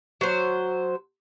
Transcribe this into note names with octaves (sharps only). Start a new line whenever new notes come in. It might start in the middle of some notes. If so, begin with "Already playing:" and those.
F#3 C5